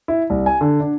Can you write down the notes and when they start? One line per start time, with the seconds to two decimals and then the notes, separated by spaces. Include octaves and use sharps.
0.08 E4
0.30 C2
0.46 G#5
0.61 D3
0.80 D4